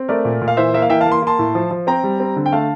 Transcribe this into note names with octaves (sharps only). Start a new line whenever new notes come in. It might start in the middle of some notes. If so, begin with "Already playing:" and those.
Already playing: C4
A3 A#4 D5
A#2
A#2
F5
E3 C5 E5
A#3 E5
F5
E3 E5 G5
F5 A5
A#3
C6
A#3 A5 C6
A2
F3
F3
C4 G5 A#5
G3
C4
D3
G5
A3 F5 A5